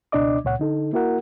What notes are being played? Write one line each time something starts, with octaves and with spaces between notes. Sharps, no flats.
C#2 B2 D4 D5 D#5 D6
C#2 A#2 C#5 F#5
D3 D#4 A4
A#3 E4 F#4 A#4 F#5